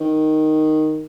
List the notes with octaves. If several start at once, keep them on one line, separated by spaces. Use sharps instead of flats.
D#3